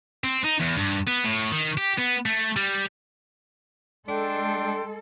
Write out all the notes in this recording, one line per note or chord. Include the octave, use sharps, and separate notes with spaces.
C4
D#4
E2
G2
B3
A2
D#3
G4
B3
A3
G3
G#3 D4 A4 G5 C6